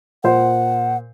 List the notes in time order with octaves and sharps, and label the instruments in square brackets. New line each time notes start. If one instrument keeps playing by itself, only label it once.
[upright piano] A#2 C5 [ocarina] F#5